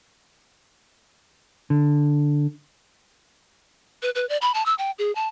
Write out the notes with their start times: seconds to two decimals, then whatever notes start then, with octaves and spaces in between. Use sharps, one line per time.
1.70 D3
4.02 B4
4.15 B4
4.29 D5
4.42 B5
4.54 A5
4.66 E6
4.78 G5
4.99 G#4
5.15 A5